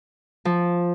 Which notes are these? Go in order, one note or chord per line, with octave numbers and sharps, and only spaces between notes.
F3